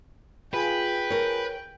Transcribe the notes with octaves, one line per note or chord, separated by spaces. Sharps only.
F4 G#4 B4 G5 G#5
A#4 C#5